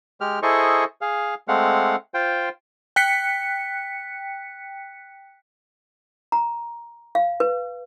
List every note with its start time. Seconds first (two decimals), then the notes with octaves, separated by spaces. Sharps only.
0.21 G#3 G4 F6
0.43 E4 G#4 A4 C5 D#5 C#6
1.01 G#4 F5
1.48 G#3 A3 C4 F5 F#5
2.14 F4 C5 G5
2.96 G5 F#6 B6 C#7
6.32 A#5
7.15 F5
7.40 B4